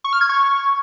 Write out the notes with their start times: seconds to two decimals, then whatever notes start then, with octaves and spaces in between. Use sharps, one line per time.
0.04 C#6
0.13 F6
0.21 G#6
0.29 C#6